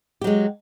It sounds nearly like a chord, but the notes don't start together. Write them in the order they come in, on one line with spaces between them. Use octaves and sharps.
G4 F#3 G#3